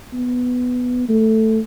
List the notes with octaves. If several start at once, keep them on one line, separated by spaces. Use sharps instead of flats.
B3
A3